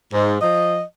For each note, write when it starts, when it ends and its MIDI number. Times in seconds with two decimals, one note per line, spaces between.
0.12 0.36 44
0.41 0.82 53
0.41 0.82 75